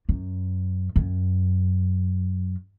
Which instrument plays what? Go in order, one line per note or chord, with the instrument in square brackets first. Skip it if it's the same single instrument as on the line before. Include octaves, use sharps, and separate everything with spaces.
[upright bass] F#2
F#2